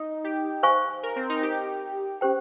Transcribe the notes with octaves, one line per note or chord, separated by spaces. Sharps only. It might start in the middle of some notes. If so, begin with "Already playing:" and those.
Already playing: D#4
G4
C5 F5 G#5 C#6
A#4
C4
D#4
G4
C#4 G4 C5 G5